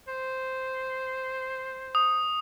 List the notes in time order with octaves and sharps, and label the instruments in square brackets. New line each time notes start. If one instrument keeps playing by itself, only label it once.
[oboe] C5
[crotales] D#6